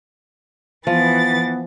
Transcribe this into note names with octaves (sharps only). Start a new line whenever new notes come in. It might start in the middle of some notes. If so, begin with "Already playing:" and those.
E3 F3 B3 A6